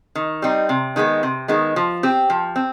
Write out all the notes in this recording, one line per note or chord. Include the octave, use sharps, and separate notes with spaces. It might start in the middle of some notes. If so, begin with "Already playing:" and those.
D#3
G3 C4 D#4
C3
D#3 G#3 B3
C3
D#3 G#3 B3
F3
C4 G4
F3
C4